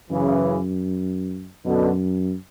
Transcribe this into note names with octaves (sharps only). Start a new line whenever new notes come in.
F#2 C#3 E3
F#2 B2 D3